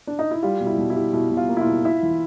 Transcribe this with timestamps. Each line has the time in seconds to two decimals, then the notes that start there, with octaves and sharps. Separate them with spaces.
0.07 D4
0.19 D#4
0.31 E4
0.43 G3 F4
0.60 B2
0.66 E4
0.78 B2
0.90 E4
0.95 G3
1.13 B2 E4
1.31 B2
1.37 F4
1.48 A#3
1.57 E4
1.61 F4
1.66 B2
1.85 E4
2.03 E3